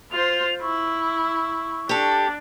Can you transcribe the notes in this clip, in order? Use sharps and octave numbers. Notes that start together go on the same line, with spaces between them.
F4 C5 F7
E4 C#6
D4 G4 A4